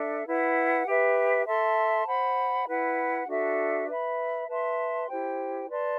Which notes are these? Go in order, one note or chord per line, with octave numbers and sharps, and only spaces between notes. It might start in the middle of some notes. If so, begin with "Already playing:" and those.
Already playing: D4 A4 E5
E4 B4 F#5
G4 B4 E5
A4 E5 A5 C6
C5 F#5 B5
E4 B4 F#5
D4 F#4 A4 E5
B4 E5 B5
B4 E5 A5 C6
E4 G4 C5 G5
B4 D5 A5 C6